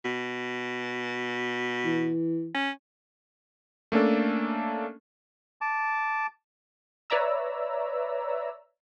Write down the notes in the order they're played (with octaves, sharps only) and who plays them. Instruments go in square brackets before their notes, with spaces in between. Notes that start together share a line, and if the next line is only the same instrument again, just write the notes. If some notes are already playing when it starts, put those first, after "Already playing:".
[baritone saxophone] B2
[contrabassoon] E3
[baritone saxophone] C#4
[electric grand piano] A3 A#3 C#4 D4 A4
[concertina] A5 D6
[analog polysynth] B4 C#5 D5 E5 A#5 E6